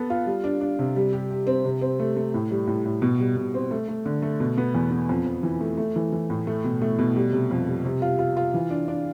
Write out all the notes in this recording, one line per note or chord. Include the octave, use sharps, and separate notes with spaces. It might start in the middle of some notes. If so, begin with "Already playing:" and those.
Already playing: B3 A4
F4
G3
D4
D4
C3
G3
G4
G4
C4
C3
C4
A3
A3
A2
G3
A2
A2
B2
G3
B2
C4
A3
A3
D3
A3
B2
B3
E2
B3
F2
F2
E3
A3
A3
E3
E3
A2
A3
B2
A3
B2
G3
C3
F2
G3
C3
F4
F4
F4
E3
D4
D4